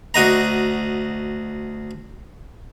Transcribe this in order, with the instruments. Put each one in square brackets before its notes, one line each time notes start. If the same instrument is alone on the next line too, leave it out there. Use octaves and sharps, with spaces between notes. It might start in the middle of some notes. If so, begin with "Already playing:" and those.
[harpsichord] D2 F#4 D#5 A#5